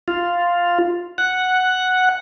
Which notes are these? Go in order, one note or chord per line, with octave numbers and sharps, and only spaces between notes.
F4
F#5